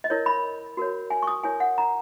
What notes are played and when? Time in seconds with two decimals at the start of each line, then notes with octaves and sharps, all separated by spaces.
0.04 D#5
0.10 E4 A#4 C#5
0.26 B5
0.77 F#4 A#4 C#5
1.10 G#5
1.23 C#6
1.27 D#6
1.44 E4 A#4 C#5 G#5
1.60 F#5
1.78 A#5